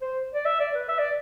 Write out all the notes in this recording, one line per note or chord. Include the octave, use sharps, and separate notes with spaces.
C5
D5
E5
D5
B4
E5
D5